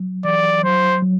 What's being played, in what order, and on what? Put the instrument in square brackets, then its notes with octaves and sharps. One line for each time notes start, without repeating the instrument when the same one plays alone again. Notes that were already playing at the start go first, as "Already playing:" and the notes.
Already playing: [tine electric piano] F#3
[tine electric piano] E3 [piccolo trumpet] D5
[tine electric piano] F#3 [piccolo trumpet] C5
[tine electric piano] F#3